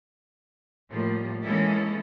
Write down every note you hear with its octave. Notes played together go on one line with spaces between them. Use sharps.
A2 F3 G3 A#3
E3 G#3 A#3 C#4 E4 A4